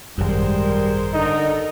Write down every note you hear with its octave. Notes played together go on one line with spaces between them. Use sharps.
G#1 F#2 G3 G#3 A#4 C5
D3 D#4 A4 A#4 A#5